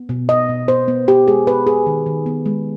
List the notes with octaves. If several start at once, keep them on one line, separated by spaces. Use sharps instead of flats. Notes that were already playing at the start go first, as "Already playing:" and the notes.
Already playing: B3
B2
B3 D#5
B2
B3 C5
B3
B3 G4
G#3 G#4
B3 B4
B3 G#4
D#3
D#3
B3
G#3